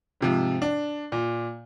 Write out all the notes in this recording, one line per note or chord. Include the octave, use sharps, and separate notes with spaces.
G#2 C3 F3
D4
A#2